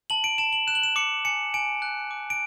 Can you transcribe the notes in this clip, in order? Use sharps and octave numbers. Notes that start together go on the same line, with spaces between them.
A5 F#7
D7
A5 E7
F#7
F#6 E7
F#7
E7
D6 C#7
G#5 C#7
G#5 D7
F#6
D6
D7